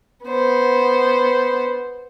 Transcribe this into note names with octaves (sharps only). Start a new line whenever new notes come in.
B3 C5